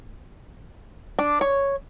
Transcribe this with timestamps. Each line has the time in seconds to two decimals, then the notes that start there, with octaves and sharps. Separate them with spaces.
1.19 D4
1.41 C#5